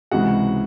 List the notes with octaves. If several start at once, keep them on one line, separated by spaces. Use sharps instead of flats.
C#2 C3 E3 G#3 F#4 F#5